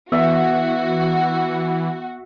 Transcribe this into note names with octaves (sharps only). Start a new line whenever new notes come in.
E3 B3 F#4 E5